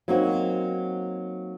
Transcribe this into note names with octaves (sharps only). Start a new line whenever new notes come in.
F#3 A#3 C4 D#4 F#4